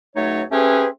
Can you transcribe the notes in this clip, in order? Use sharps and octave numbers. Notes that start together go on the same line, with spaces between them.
C#2 F#3 A3 D#4 C#5
A3 C4 C#4 G4 G#4 B4